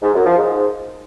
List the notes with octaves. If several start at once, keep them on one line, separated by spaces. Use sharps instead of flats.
G#2
F#2
F3
G#2